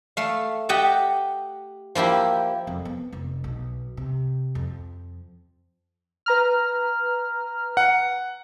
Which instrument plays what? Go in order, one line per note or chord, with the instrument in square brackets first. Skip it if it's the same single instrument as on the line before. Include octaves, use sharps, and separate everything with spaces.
[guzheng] A3 F5
G4 D#5 F#5 A5
F3 A#3 E4 G4
[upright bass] F2
B3
F1
B1
C3
F2
[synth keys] B4 A#5 F6
[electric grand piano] F#5